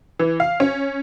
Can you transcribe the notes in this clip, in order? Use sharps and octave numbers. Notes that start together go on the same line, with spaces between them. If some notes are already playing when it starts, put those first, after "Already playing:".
E3
F5
C#4